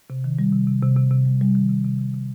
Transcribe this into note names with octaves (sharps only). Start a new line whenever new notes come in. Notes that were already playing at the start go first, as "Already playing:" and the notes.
C3
D#3
G3
C3
C3
C3
C3
C3
G3
G3
D#3
C3
C3
C3
C3